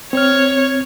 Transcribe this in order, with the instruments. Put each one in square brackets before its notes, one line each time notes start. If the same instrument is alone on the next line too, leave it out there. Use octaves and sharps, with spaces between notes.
[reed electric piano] C4 F6 [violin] C#5